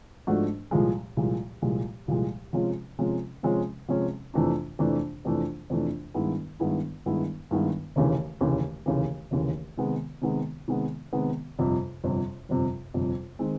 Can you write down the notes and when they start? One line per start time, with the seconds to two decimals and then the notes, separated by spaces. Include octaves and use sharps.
0.27 G#2 F3 A3 D4 F#4
0.71 C2 A#2 F3 G#3
1.17 C2 A#2 F3 G#3
1.62 C2 A#2 F3 G#3
2.08 C2 A#2 F3 G#3
2.53 C3 F3 G#3 C#4 F4
2.99 C3 F3 G#3 C#4 F4
3.43 C3 F3 G#3 C#4 F4
3.88 C3 F3 G#3 C#4 F4
4.34 F2 C3 E3 A3 D4
4.79 F2 C3 E3 A3 D4
5.25 F2 C3 E3 A3 D4
5.70 F2 C3 E3 A3 D4
6.14 G2 D#3 G#3 B3 E4
6.60 G2 D#3 G#3 B3 E4
7.06 G2 D#3 G#3 B3 E4
7.51 G2 D#3 G#3 B3 E4
7.96 F1 D#2 C#3 E3
8.41 F1 D#2 C#3 E3
8.86 F1 D#2 C#3 E3
9.31 F1 D#2 C#3 E3
9.77 C3 D#3 G#3 B3
10.22 C3 D#3 G#3 B3
10.68 C3 D#3 G#3 B3
11.13 C3 D#3 G#3 B3
11.59 G1 F2 C3
12.04 G1 F2 C3
12.49 G1 F2 C3
12.94 G1 F2 C3
13.39 D#3 G#3 C4